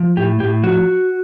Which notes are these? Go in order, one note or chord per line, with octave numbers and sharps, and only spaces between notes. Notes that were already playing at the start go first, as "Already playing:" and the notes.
Already playing: F3
A2 G4
A2 G4
F3 F#4